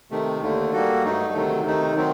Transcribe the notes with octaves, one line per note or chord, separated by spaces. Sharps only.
C3 D#3 A3
D#2 D3 A3
G3 A#3 F#4 A4
G2 F#3 A3 D#4
D2 C3 D#3 F#3 A3
C3 D#3 A3 D#4
D#3 F#3 C4